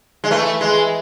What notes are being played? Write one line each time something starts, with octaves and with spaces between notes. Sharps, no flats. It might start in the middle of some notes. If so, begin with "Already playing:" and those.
G#3
E3 A3
G#3